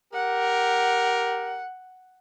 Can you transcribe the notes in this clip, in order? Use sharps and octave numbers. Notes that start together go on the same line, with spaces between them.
G4 A#4 F#5